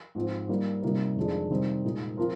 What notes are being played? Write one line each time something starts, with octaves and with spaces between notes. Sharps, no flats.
G#2 F3 C4 F4
G3 A#3 D#4
C3 G3 A#3 D#4 A#4
F2 D#3 G#3 D4 G#4
C3 D#3 G3 C4 D#4
A#2 G#3 D#4 G#4
F3 C4 F4 A#4